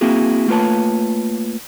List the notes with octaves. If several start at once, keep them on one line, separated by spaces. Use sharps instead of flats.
A#3 C4 E4 F#4 G#4
A3 A#3 F4 B4 C#5 A5